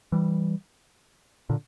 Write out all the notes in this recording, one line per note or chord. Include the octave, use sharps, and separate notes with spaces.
E3 G3
A#2 D3